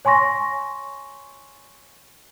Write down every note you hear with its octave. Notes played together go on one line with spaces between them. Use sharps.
C#5 G#5 C6 C#6 A#6